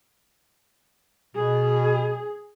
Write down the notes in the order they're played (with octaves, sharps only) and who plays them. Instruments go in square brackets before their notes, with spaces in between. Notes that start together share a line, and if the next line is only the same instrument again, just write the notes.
[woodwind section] B2 [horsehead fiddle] G#4